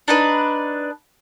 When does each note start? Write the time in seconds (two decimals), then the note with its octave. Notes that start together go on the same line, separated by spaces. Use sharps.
0.08 D4 D#4 B4